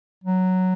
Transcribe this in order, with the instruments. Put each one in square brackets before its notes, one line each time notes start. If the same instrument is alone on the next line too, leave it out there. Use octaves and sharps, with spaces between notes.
[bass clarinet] F#3